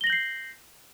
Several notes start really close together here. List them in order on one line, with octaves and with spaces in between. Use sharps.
G7 A#6 F#7 G6 C7